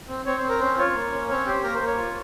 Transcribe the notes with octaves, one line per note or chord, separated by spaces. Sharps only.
C4
C4 C#5
C5
C4
A#4
C#4 C5
F4 C#5
A#3
C#4
C4 C#5
G4 C5
A#3 A#4
C5
A#3 C#5
F4